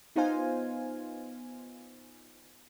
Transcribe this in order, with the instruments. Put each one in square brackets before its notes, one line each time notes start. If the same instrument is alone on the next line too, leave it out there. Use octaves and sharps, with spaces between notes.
[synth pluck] B3 D#4 F4 C5 F5 G#5